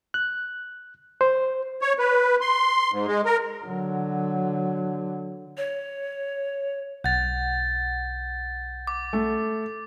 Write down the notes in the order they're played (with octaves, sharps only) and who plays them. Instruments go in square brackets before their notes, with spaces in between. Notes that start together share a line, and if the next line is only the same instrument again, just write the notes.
[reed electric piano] F#6
C5
[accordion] C#5
B4
C6
G#2
G#3
A#4
[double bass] D3 F#3
[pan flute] C#5
[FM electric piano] B1 F#5 [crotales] G6 A6
[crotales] D6
[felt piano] A3